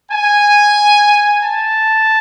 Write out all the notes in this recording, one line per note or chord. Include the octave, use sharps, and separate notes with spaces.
G#5
A5